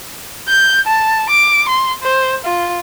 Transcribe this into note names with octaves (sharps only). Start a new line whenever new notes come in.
G6
A5
D6
C6
C5
F4